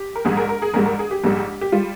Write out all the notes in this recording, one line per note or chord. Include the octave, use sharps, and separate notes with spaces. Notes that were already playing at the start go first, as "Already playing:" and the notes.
Already playing: G4
A#4
A#1 G#2 G3 G#4
A#4
A#4
G#4
A#1 G#2 G3 A#4
A#4
G#4
G4
A#1 G#2 G3
G4
G3 F4